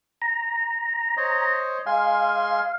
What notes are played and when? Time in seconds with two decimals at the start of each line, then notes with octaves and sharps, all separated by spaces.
0.22 A#5
1.17 C5 C#5 D#5
1.86 G#3 F5 G#5 C6